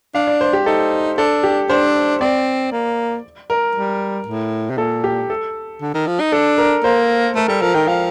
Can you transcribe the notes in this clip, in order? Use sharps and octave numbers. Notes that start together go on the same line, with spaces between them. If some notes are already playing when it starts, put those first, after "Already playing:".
D4 F5
D5
C5
G4
D#4 A4
D4 A4
G4
D4 C5
C4 D5
A#3
A#4
G3
A2
C3
A#2 A4
G4
A4
D3
D#3
F3
D#4
D4 A4
A#4
A#3 C5
A3 A#4
G3 A4
F3 A#4
D#3 G5
F3 F5